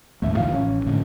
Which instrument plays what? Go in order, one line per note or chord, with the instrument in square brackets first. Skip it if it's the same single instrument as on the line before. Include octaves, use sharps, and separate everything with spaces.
[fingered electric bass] A1 D#2 G#2 [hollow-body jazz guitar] A3 E5
[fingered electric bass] C3 D#3 F3 [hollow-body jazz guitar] F5
[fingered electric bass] A1 [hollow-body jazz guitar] F3 C#4
[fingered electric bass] A2 D3 A3